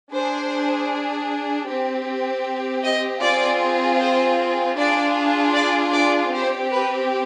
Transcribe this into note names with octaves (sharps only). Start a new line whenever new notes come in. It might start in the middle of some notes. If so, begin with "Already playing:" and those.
D4 G#4 C5
C4 G4
D#5
C4 F4 G#4 D5
C5
D4 F4 G#4 D5
D5
D5
C4 G4 C5
B4